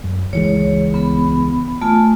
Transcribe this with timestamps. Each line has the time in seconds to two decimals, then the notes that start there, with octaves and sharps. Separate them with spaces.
0.04 F#2
0.33 C#2 E3 G#3 C#5
0.94 B3 B5
1.82 A3 F4 G#5